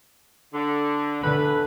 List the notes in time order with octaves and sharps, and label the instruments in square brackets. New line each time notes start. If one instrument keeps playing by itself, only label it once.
[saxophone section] D3
[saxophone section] E2 A2 B4 [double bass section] D3